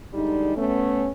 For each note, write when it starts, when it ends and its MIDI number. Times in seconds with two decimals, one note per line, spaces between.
0.14 0.54 50
0.14 0.54 55
0.14 0.54 56
0.14 0.54 63
0.56 1.08 57
0.56 1.08 59
0.56 1.08 61